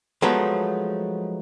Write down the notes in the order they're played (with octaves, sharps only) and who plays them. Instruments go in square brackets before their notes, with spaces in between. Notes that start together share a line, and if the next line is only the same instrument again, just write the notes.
[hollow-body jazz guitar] F3 F#3 G#3 A3 B3 D#4